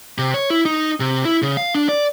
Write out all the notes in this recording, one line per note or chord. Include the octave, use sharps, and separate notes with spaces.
C3
C#5
E4
D#4
C3
E4
C#3
F5
D4
D5